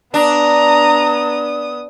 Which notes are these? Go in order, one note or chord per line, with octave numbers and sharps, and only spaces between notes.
B3 D4 A#5 D#6